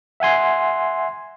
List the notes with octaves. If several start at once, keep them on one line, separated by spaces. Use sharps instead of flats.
E5 F#5 G#5 C6